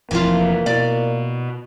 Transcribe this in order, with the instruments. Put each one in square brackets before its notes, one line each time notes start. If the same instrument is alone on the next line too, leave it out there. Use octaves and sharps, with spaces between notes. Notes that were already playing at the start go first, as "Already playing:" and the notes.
[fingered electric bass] F1 F2 [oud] E3 F4 [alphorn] A#3
[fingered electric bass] B2 [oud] D5